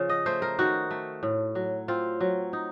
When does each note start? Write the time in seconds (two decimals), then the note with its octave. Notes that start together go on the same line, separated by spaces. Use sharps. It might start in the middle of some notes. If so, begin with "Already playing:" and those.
Already playing: C#3 F3
0.10 D#5
0.26 A3 C5
0.42 A#4
0.59 D#3 F#4
0.91 A3
1.23 A2
1.55 F#3
1.88 C4 F4
2.20 F#3
2.53 D#4